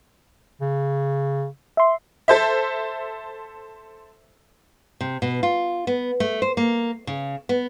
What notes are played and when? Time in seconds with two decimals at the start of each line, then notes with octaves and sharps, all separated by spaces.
0.61 C#3
1.77 E5 C6
2.28 A4 C5 E5
5.01 C3
5.22 B2
5.43 F4
5.87 B3
6.20 A3
6.42 C5
6.57 A#3
7.07 C#3
7.49 B3